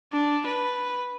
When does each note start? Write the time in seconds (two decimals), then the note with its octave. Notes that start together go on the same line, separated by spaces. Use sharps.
0.13 D4
0.46 B4